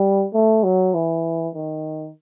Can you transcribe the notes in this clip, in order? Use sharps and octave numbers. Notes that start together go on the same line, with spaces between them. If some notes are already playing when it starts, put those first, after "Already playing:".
Already playing: G3
A3
F#3
E3
D#3